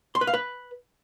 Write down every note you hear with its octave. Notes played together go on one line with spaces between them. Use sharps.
C6
B4
F5
B4